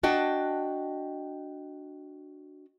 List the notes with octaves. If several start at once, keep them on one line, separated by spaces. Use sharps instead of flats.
D4 F#4 D#5 G5 A5